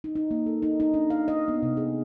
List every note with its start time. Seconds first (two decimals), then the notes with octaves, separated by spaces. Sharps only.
0.04 D#4
0.15 D#4
0.31 A#3
0.46 A4
0.62 D#4
0.80 D#4
0.94 D4
1.10 F5
1.28 D#5
1.48 B3
1.63 C3
1.77 G#4